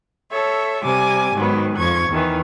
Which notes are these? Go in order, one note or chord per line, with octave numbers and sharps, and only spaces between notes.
A4 C#5 E5
C3 G3 G#5 D6
G#2 D#3 F#3 B3
F2 C#6 G#6
E2 D#3 E3